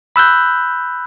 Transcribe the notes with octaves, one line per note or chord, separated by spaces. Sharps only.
B5 E6 F#6 G6